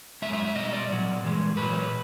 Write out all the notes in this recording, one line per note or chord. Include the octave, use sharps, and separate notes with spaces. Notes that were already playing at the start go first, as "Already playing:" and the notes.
F#2 D#3 G#3 E5
E5
E5
B2 G3 D#5
D5
A#2 F#3
G2 E3 G#3
A#2 B4
F#3